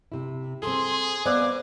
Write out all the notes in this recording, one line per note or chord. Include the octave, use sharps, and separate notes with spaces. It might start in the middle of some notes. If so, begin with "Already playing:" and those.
C3 E4
C4 G#4 A4 C6
B3 B4 C5 D5 D#5 F5 D6